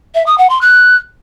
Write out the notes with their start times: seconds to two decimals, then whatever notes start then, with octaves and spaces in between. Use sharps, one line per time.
0.15 E5
0.26 D#6
0.38 F#5
0.50 C6
0.61 F#6